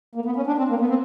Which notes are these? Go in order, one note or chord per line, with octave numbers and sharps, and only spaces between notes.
A#3
B3
C#4
D4
C4
A#3
B3
C4